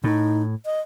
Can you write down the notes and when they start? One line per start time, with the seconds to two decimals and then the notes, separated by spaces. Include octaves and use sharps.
0.04 A2 D#4
0.65 D#5